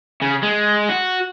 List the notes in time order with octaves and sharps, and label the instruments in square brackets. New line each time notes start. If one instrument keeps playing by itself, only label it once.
[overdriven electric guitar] C#3
G#3
F#4